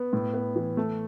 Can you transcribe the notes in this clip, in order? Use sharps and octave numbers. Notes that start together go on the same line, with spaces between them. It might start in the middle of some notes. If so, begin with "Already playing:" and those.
Already playing: B3
A2
B3
E3
A3